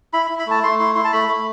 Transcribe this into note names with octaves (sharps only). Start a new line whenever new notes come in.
E4 B5
B5
E4
B5
A3 A5
A3 C6
E4 C6
E4 C6
A5
A3 B5
A3